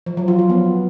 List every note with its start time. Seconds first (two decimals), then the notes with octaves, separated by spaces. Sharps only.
0.06 F3
0.17 F#3
0.28 F4
0.39 F3
0.50 B3